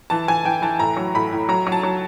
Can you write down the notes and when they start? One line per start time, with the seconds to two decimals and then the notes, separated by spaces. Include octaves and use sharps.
0.10 E3 A5
0.27 E3 G#5
0.45 E3 G5
0.62 E3 A5
0.79 A2 A#5
0.97 F#3
1.15 A2 B5
1.32 A2
1.49 F#3 A#5
1.67 F#3
1.72 A5
1.83 F#3